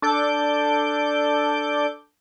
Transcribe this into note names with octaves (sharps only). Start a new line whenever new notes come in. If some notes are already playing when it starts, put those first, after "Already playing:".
D4 A4 D6 G6